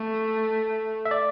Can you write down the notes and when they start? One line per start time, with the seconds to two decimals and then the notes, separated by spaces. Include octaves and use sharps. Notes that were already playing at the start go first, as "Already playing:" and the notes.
Already playing: A3
1.05 E5
1.11 D5